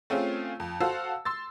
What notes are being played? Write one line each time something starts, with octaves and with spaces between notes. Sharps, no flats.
A3 C4 C#4 F4 G#4
F2
F#4 A4 C5 F5 A5 E6
C6 E6 A6